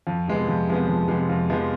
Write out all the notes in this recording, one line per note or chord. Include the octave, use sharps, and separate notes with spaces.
F2
C3 F3 G#3 B3
F2
C3 F3 G#3 B3
F2
C3 F3 G#3 B3
F2
C3 F3 G#3 B3